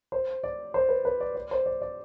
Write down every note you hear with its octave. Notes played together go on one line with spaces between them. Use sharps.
C5
D5
C5
B4
B4
D5
D5
C5
D5
D5